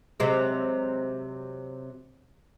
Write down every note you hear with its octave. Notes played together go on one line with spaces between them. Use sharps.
C3 F#3 G#3